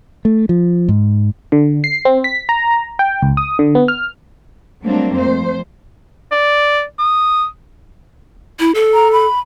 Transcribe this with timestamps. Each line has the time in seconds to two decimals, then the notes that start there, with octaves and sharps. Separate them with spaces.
0.25 A3
0.49 F3
0.89 G#2
1.52 D3
1.84 C7
2.05 C4
2.24 B6
2.49 A#5
2.99 G5
3.22 C#2
3.37 D#6
3.59 D3
3.75 B3
3.88 F6
4.84 F#3 G3 A3 A#3 C4 D4
5.17 F2 C5
6.32 D5
6.99 D#6
8.60 E4
8.75 A4
8.94 A#5
9.12 B5